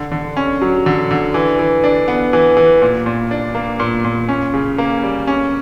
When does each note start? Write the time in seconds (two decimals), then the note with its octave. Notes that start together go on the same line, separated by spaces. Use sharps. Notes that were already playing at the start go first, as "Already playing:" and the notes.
Already playing: D3
0.12 D3
0.37 C#4
0.61 F#3
0.86 D3
1.11 D3
1.34 E3
1.59 E3
1.84 D4
2.08 B3
2.33 E3
2.57 E3
2.82 A#2
3.06 A#2
3.31 D4
3.55 A#3
3.80 A#2
4.05 A#2
4.29 C#4
4.54 C#3
4.78 A#3
5.03 G3
5.27 C#4